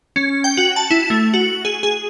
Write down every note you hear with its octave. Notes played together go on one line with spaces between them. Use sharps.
C#4
G5
F#4
A5
E4
A3
F#4
G#4
G#4